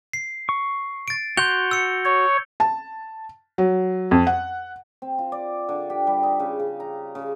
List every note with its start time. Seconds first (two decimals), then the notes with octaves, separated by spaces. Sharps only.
0.13 C7
0.49 C#6
1.08 A6 D7
1.37 F#4 F#5 C6 G6 F7 G7
1.71 E6 C#7
2.05 C#5
2.60 A5
3.58 F#3
4.11 F2
4.27 F#5
5.02 C4
5.19 F4
5.32 D5
5.69 D3
5.90 G4
6.07 G3
6.23 D#4
6.40 C#3
6.60 C#3
6.80 A#5
7.15 C#3